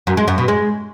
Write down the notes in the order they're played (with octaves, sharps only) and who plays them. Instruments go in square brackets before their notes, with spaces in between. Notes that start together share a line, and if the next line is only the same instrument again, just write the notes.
[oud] F#2
G#3
F#2
B2
G#3